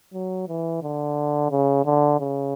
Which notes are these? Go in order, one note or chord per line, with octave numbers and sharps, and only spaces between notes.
F#3
E3
D3
C#3
D3
C#3